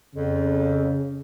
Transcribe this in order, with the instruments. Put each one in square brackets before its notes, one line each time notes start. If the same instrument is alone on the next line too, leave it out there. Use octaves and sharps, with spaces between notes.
[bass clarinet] F2 [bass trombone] C#3